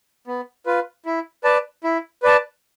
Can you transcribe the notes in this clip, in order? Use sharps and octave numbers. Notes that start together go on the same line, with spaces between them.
B3
F4 B4
E4
B4 D5 A5
E4
B4 D5 A5